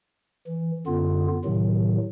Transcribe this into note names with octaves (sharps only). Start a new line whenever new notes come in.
E3
F#2 D3 B3 F4
A2 C3 D#3 F#3